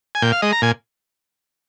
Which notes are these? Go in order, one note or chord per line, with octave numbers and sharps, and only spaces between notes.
G#5
A#2 G5
F5
G#3 D#5
A#5
A#2 G#5